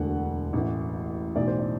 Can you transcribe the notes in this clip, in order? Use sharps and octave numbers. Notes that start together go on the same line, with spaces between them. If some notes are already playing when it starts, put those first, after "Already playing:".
Already playing: E1 D2 D3 F#5
A1 A2 E3
B1 A2 E3 D5
C5
D5